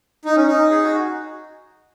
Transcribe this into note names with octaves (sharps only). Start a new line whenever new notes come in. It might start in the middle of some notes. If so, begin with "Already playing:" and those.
D#4
C#4
D#4
G#4
F#4